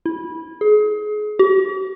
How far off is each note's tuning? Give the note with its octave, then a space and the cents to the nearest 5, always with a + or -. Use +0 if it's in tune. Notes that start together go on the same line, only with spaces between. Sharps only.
E4 -15
G#4 +30
G4 -45